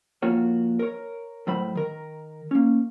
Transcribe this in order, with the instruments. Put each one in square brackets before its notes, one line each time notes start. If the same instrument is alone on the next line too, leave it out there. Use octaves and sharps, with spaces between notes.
[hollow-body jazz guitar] F3 A#3 F4 F#4 C#5
A#4 C#5
A2 F#3 C5 B5
D#3 A#4
A#3 C#4